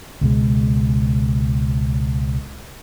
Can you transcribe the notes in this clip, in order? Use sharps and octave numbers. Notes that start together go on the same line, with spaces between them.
C#2 B2 G#3